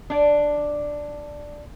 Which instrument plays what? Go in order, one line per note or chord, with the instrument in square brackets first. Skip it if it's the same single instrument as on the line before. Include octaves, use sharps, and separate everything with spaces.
[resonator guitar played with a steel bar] D4 D5